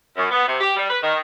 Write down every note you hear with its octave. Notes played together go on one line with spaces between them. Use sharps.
F#2
B3
C3
G4
G3
B4
D#3